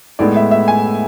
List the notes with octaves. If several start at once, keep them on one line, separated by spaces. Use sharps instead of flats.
A2 G#3 B3 E4 D5
E5
E5
G#5